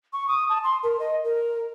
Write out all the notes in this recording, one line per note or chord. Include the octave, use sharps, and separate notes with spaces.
C#6
D#6
A5
C6
A#4
D#5
A#4